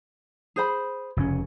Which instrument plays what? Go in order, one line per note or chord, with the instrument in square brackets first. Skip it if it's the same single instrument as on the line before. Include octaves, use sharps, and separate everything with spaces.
[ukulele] G#4 C5 B5
[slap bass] F1 C#3 C#4